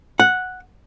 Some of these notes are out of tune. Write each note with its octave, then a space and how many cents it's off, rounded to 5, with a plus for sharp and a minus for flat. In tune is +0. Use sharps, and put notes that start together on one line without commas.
F#5 -5